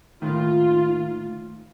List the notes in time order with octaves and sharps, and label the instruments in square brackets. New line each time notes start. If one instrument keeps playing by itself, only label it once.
[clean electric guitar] D#2 A2 D#3 [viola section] F4